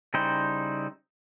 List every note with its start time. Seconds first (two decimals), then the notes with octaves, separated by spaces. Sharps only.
0.14 C#3 G3 D#4 E4 C5